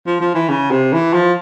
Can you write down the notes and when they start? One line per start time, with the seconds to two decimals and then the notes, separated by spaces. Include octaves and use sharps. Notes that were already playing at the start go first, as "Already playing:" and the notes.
0.07 F3
0.20 F3
0.34 E3
0.49 C#3
0.71 C3
0.93 E3
1.13 F3